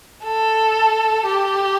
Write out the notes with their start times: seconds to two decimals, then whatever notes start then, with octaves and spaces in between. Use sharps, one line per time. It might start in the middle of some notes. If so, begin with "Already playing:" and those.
0.24 A4
1.26 G4